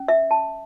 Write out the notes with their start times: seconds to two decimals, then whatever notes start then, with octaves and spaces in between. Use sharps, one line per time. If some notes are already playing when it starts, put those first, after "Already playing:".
Already playing: C#4
0.08 E5
0.31 A5